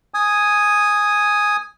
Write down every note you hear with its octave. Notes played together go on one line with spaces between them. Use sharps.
G#5 D#6